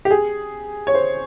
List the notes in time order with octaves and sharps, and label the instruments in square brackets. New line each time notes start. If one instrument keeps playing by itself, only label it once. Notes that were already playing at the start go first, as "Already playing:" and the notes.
[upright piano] G4
G#4
C#5
C5